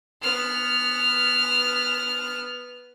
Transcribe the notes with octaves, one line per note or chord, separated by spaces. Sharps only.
B3 F6